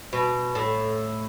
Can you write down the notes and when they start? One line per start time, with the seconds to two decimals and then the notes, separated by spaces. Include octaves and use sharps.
0.13 B2
0.55 A2